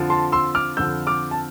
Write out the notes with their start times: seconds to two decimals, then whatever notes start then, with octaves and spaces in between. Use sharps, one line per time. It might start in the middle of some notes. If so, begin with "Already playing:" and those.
Already playing: F2 D3 F3
0.10 A5 C6
0.32 C6 E6
0.55 D6 F6
0.77 F2 D3 F3 E6 G6
1.07 D6 F6
1.31 A5